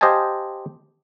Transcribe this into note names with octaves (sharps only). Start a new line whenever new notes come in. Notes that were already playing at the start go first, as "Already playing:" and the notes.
G4 C5 D#5 F5 G#5 A5